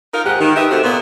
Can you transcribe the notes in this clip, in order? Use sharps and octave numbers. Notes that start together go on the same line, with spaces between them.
D#4 F4 A#4
D#2 G#2 G#3 G4 F#5
D#3
G4 B4 D#5 E5
C3 A3 C4 F#4
A#2 A#3 B3